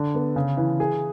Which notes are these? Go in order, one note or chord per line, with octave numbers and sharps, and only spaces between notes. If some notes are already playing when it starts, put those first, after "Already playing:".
Already playing: D3
B3
C#3
E3
G#4